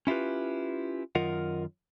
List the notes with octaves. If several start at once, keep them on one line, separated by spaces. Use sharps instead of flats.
C#4 E4 F4 G4 B4
F#2 D#3 F4 A#4 D#5 F#5